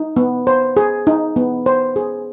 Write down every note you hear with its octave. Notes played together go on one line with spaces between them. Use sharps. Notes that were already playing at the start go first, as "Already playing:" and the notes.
Already playing: D#4
B3
C5
G#4
D#4
B3
C5
G#4